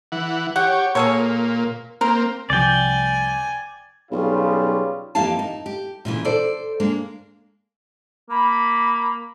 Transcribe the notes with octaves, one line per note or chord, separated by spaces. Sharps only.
E3 F#5
G4 C#5 F#5
A#2 G#4 A4 C#5
A#3 C4 A#4
C2 C3 F3 D5 G5 G#5
B1 C#3 G3 F4
F2 E3 A#3 G4 F5 A5
D#4
G4
A#2 C#3 E3
A4 C5 D5
G#3 A#3 D4
A#3 B5